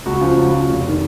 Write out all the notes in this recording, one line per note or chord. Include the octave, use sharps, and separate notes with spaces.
C#2 F#4
C#3 F3
C#2 F#4
C#3 F3
F1
D#3